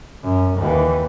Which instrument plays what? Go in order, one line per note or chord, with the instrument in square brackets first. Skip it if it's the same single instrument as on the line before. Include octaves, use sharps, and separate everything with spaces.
[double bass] F#2
D#2 E3